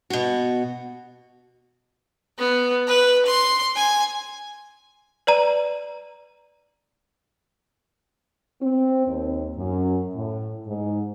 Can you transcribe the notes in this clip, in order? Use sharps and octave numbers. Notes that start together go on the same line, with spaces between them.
B2 F#4
B3
B4
C6
G#5
B4 D5 A#5 D#7
C4
D#2
F#2
A2
G#2